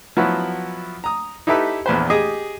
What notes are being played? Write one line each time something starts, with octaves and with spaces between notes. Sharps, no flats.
F3 F#3 B3 E4 F#4
A#5 D#6
D#4 E4 G4 A4 B4 E5
A#1 E2 B4 C5
G4 G#4 D#5